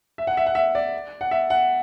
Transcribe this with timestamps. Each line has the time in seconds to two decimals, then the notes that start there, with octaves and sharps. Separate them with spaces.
0.18 E5
0.27 F#5
0.37 E5
0.46 F#5
0.55 E5
0.75 D5
1.21 F#5
1.31 E5
1.50 F#5